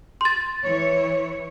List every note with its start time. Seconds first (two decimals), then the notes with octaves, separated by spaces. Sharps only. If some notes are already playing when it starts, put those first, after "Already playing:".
0.21 C6 A6
0.63 E3 C#5